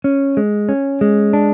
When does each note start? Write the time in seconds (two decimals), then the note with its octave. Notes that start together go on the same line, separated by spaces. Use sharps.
0.04 C#4
0.37 G#3
0.69 C#4
1.01 G#3
1.33 D4